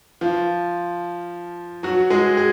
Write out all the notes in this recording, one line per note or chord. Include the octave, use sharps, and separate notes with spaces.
F3 F4
F#3 F#4
G#3 G#4
G#4